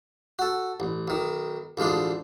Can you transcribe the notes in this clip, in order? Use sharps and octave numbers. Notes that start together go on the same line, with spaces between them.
F#4 A4
A1
B1 D#3
A1 D2 F3 G#3 D4